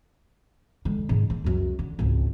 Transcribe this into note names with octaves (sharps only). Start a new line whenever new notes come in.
D3 G#3
G#2 C#3
A#3
C#2 F#2
D3
G#1 C#2